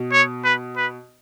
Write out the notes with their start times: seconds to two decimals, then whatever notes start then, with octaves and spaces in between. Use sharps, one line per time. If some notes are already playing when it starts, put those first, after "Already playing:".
Already playing: B2
0.12 C#5
0.44 B4
0.77 B4